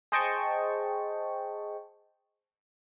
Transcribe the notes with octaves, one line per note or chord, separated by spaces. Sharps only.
G#4 C5 D#5 G5 A5 C#6